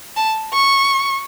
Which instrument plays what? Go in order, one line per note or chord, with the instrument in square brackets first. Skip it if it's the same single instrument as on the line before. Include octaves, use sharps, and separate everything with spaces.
[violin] A5
C#6